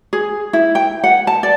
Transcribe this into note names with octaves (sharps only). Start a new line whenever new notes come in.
G#4
E4
G5
F#5
A5
D5